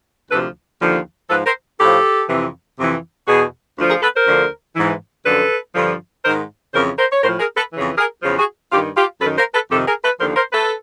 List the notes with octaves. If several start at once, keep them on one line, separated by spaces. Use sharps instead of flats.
D2 C3 F3 A4 B4
D#2 D3 F3
G#2 F3 A4 B4
A#4 C5
A2 F3 G4 A4
F2 C3 E3
F2 C3 E3
E2 B2 F#4 G#4
D2 D3 F3
G#4 A#4
A4 B4
A#4 C5
D2 D3 F3
G#2 E3
F#2 D3 F3 A4 B4
G2 D3 F3
G#2 D#3 A#4 C5
F2 C#3 E3 A#4 C5
A#4 C5
C#5
A2 F3 A#4 C5
G#4 A#4
A4 B4
F2 C#3 E3
G#4 A#4
E2 C#3 F3
F#4 G#4
G2 D#3 F4 G4
F4 G4
F#2 D#3 A4 B4
A#4 C5
A4 B4
F2 C3 D#3 G4 A4
G#4 A#4
A4 B4
D#2 D3 F3 A#4 C5
A#4 C5
A4 B4